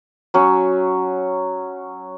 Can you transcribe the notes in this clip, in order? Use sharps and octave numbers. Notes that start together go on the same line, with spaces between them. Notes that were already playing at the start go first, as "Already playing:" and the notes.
F#3 C#4